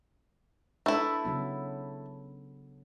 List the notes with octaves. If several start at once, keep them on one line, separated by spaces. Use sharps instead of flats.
A3 D4 E4 A4 B4
C#3 F#3 B3